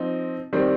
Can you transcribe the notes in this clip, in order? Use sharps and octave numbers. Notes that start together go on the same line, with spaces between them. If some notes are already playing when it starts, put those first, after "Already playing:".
Already playing: F3 C4 D#4
D#3 G3 C4